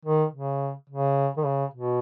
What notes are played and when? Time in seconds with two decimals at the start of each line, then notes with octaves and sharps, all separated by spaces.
0.05 D#3
0.33 C#3
0.90 C#3
1.37 D#3
1.45 C#3
1.74 B2